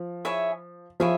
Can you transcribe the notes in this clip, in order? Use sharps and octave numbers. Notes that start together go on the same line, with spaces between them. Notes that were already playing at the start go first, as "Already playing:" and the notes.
Already playing: F3
E4 G#4 C#5 E5
F3 E4 G#4 C#5 E5